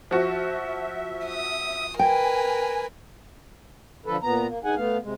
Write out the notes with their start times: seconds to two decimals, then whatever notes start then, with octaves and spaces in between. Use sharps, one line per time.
0.11 F3 F#4 E5
1.26 D#6
1.99 A#4 B4 G5 G#5
4.06 D3 F3 A4 B4
4.23 A#2 B3 A#5
4.48 A#3
4.64 G2 D#4 G#4 F#5 G#5
4.76 A3 B3 F5
5.03 C3 G#3